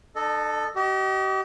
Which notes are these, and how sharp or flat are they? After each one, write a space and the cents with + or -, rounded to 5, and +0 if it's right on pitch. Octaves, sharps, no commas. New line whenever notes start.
D4 +45 A4 +0 D#5 -20
G4 -40 D#5 +0